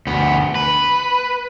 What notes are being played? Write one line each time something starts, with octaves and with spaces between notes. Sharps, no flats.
D2 B3
B4